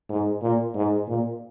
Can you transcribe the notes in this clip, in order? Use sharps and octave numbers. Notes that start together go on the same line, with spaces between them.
G#2
A#2
G#2
A#2